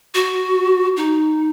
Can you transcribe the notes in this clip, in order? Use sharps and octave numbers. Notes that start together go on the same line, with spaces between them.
F#4
D#4